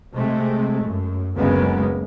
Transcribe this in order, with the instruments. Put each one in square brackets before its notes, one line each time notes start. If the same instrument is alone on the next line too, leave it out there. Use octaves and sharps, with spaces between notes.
[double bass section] C3 G#3 A3
F#2
F#1 D2 C#3 G#3 A#3 B3